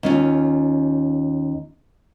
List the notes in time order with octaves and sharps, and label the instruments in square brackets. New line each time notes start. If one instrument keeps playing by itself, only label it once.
[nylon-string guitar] D#2 C#4 F4